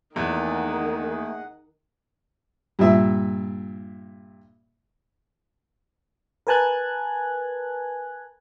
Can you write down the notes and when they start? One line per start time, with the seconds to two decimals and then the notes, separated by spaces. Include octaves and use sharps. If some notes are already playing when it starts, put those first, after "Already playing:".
0.16 E2 D#3 A3 A#3 G#4 D#5 F#5
2.79 G2 A#2 E5
6.47 A#4 B4 G#5 A5 F#6 G#6